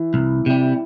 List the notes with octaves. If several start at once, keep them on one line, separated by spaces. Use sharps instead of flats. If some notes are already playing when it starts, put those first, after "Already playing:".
Already playing: E3
C2
C3 G3